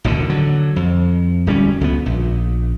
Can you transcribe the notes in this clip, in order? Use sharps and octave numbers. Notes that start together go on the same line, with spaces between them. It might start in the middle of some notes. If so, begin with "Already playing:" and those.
A1 D#2 B2 D3
D3 F#3
F2
D1 G3 C#4
C#2 B3
A#1